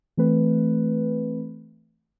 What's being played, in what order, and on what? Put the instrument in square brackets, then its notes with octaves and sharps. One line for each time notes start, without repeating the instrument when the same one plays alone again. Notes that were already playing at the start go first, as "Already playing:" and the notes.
[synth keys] E3 A3 C4 B4